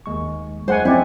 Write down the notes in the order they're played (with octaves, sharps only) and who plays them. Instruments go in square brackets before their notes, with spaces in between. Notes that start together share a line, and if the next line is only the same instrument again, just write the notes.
[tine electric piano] D#2 G#3 C#6
[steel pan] G#3 F#5 G#5 [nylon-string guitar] C5
[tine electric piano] F3 C#4 [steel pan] C4 D5 [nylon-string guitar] E4